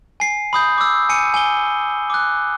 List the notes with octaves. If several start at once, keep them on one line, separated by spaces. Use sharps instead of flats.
G#5 C7
B5 D#6 G6
D6 E6
G#5 C#7 D#7
G#5 G7
D6 F#6